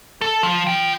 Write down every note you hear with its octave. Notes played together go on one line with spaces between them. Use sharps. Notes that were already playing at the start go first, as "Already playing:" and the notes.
A4
F3
F4 G5